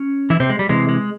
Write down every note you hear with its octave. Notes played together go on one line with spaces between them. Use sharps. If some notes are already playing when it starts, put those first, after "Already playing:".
Already playing: C#4
E3 E4
C3 C4
G#3
G3
C3 E3 G#3
G#3